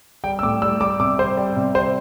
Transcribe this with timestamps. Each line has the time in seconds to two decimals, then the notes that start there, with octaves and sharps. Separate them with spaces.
0.24 G3 G5
0.39 E6
0.43 A2 D6
0.62 G3 E6
0.81 G3 D6
1.00 C3 D6
1.18 G3 C5
1.37 G3
1.56 C3
1.74 G3 C5